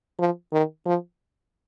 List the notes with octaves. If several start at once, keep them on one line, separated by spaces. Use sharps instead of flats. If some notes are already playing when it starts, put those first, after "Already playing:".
F3
D#3
F3